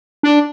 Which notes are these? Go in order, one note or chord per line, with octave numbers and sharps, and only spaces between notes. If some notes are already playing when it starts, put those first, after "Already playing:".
D4